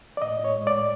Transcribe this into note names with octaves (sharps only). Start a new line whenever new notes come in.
D5
A2 D#5
A2
C#5
G#3
D5
A2